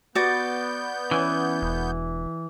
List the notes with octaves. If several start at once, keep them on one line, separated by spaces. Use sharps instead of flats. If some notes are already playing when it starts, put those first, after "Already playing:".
B3 F#4 D5 G6
E3 C#4
E1